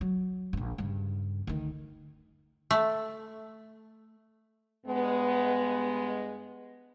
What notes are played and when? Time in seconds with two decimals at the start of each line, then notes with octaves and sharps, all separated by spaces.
0.01 F#3
0.53 E1 A#1
0.78 G2 C#3
1.47 D2 D#3
2.71 A3
4.86 G2 G#3 B3